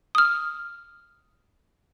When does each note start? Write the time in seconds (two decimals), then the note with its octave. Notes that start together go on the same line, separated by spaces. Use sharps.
0.15 D#6 F6